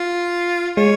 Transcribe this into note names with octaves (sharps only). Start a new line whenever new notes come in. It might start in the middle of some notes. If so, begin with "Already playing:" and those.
Already playing: F4
G#3 C#5